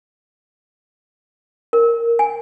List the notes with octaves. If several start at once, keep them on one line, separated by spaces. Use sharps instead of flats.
A#4
G#5